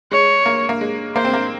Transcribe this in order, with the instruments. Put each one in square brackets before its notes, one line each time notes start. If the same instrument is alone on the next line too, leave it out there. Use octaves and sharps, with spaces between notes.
[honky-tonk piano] G#3 [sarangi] C#5
[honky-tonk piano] A#3
A#3
G#3
[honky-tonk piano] A#3 [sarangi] C5
[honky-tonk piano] C4
A#3